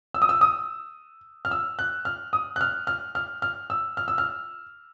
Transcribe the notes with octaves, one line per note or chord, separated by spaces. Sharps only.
E6
D#6
E6
D#6
F6
E6
F#6
F6
D#6
F#6
F6
F6
F6
F6
E6
F6
E6
F6